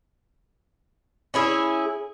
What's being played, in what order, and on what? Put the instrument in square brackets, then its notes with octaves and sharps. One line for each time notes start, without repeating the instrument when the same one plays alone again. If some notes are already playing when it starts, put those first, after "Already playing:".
[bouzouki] C#4 E4 G#4